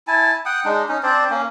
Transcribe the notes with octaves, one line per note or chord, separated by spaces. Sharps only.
E4 G#5 A5
F#5 G5 D#6
G#3 D4 D#4
C#4 D#4
C4 D4 C5 D5
A#3 C#4